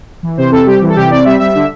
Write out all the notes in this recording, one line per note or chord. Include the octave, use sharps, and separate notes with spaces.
E3
C3 C5
C4 A4
G3 G4
E3
A4
C3 G4
C4 D5
G3 E5
G3 E5
D3